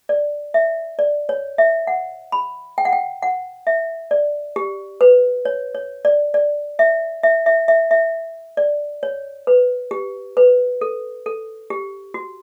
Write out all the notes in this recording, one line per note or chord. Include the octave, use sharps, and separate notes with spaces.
D5
E5
D5
C#5
E5
F#5
B5
G5
F#5
G5
F#5
E5
D5
G4
B4
C#5
C#5
D5
D5
E5
E5
E5
E5
E5
D5
C#5
B4
G4
B4
A4
A4
G4
F#4